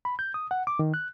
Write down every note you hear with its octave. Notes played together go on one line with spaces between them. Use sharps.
B5
G6
D#6
F#5
D6
D#3
F#6